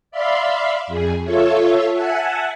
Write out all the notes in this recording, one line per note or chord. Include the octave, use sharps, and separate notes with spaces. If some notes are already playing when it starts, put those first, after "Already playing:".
D5 E5 F5 B5 C6
F2 G#4
F4 A4 C#5 E5
E5 F#5 G#5 A5